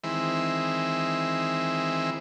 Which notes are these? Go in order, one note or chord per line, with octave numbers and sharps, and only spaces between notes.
D#3 E3 G#3 C4 E4